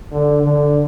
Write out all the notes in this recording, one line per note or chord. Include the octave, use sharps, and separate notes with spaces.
D3
D3